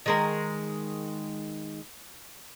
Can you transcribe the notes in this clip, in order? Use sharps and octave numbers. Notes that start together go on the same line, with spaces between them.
D#3 G#3 A#4